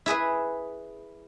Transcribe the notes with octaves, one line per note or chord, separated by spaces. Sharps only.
E4 G#4 B4 E5